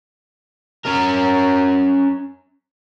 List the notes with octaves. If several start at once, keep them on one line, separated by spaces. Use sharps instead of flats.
C#4 A#4